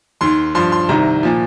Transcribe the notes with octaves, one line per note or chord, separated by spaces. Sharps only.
D#2 D#3 C6
G2 F3 C6
C6
C2 C3 D#3 A#5
A#2 F3